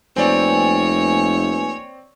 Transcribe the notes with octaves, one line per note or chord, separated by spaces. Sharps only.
F1 A#3 C4 B4 C#5 D5 G#5